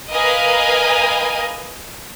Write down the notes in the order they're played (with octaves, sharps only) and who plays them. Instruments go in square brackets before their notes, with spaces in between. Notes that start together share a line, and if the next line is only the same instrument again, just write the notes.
[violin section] A#4 B4 D#5 F5 G#5